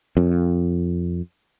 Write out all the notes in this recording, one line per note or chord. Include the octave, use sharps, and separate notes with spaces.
F2